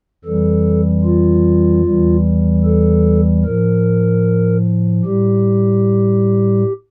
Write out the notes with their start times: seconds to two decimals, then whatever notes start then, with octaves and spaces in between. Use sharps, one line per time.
0.24 F2 E3 G3 A4
1.04 F4
1.84 E2 E3 G3
2.64 A4
3.44 A2 F3 A#4
5.05 A2 G3 G4